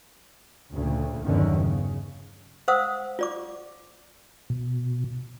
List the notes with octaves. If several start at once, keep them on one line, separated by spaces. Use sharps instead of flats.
D2 A#2 C#3
G1 E2 D3 D#3 F#3 C#4
C#3
C5 F5 F#5 D#6 E6
F4 D5 D6
B2